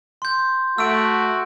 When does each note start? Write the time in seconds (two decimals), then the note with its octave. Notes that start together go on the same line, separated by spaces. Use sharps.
0.22 C6 G6
0.78 A3 F#4 E6 D7